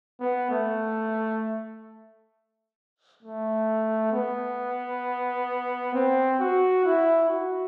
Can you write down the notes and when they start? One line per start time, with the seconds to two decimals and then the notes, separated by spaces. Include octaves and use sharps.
0.20 B3
0.50 A3
3.23 A3
4.13 B3
5.95 C4
6.40 F#4
6.85 E4
7.29 F#4